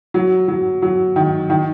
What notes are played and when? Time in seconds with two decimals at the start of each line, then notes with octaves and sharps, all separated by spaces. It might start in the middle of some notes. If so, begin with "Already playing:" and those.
0.14 F#3
0.48 F#3
0.82 F#3
1.16 D#3
1.50 D#3